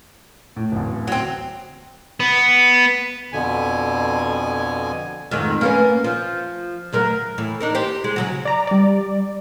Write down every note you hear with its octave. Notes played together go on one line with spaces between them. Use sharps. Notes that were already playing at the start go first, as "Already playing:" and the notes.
A2
D1 A1
F#3 C4
B3
F2 B2 D3 G#5
F2 G#2 D#3
A#3 B3 C#4
F3
D2 F#3 A#4
A2 E3
D4 D#4 A#4
G4 C5
G#3
C#3 F#3 F#4
D5 A#5 D6
G3 D5